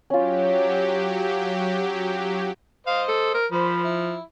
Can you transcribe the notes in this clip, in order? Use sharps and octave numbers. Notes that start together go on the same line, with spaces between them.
F#3 C#4 F4 G4
C5 D#5 F5
A4
A#4
F3 C5 B5
E4